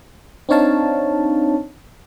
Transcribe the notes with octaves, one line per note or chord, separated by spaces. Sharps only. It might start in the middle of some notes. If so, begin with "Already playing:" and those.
C4 D4 D#4 C#5 F5 A5